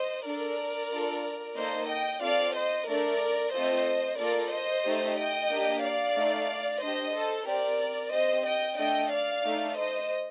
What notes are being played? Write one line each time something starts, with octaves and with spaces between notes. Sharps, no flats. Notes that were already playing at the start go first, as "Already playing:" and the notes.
Already playing: C5 D#5
D4 A4 A#4 D5
D4 F4 A4
A#3 D#4 A4 C5 D#5
D#5 G5
C4 F4 A4 D5 F5
C5 D#5
A3 D4 A4 A#4 D5
A3 C4 F4 A4 C5 D#5
A#3 F4 A4 A#4 D5
C5 D#5
A3 D#4 G4
D#5 G5
A#3 D4 G4
D5 F5
A3 D#4 A4
D4 G4 C5 D#5
A4 C5
C4 G4 A#4 D5
C4 G4 C5 D#5
D#5 G5
A3 D4 A4 D#5 G5
D5 F5
A3 D#4 A4
C5 D#5